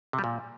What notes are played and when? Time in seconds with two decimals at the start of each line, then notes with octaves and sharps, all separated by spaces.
0.13 C3
0.19 G3
0.24 A#2